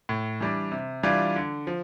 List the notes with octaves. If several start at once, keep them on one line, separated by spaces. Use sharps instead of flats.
A2
E3 G3 D4
C3
E3 G3 D4 F4
D3
F3